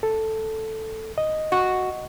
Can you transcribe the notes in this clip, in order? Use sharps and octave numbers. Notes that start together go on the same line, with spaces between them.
A4
D#5
F#4